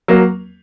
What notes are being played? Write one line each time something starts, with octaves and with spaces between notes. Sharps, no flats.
F#3 A#3